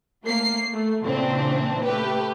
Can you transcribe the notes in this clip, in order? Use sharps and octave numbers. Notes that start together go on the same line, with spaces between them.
A3 A#3 C7
A3
A#2 C#3 E3 C4 D4
A3 G4 B4